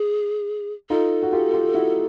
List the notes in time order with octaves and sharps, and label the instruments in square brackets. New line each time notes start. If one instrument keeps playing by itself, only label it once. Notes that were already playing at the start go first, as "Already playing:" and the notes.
Already playing: [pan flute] G#4
[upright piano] D#4 F4 [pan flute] A4
[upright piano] F#4
F4 G4
F4 G4
E4 F#4